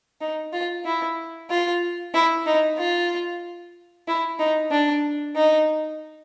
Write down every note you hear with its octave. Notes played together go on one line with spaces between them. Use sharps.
D#4
F4
E4
F4
E4
D#4
F4
E4
D#4
D4
D#4